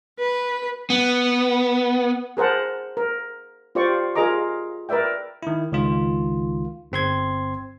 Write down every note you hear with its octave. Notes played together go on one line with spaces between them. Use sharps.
B4
B3
G#4 A#4 C5 F#5 A5
A#4
F4 G4 C5 D5 C#6
F4 G#4 A#4 D#5 A#5 D6
A#4 B4 D5 E5 G5
D#3 E4
C#2 D#3 F4
G1 C4 C6 G#6